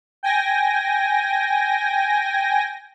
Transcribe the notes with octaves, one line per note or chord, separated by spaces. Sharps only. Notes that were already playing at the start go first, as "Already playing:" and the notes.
G5 G#5 A#6